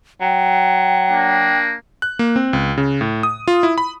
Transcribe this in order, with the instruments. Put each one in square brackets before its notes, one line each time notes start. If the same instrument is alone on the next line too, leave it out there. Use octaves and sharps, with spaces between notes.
[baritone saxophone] F#3 [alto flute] G5
[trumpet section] A#3 D4
[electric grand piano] F#6
A#3
C4
C#2
C#3
A2
D#6
F4
E4
B5